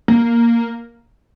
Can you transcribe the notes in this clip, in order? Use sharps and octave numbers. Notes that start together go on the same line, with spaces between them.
A#3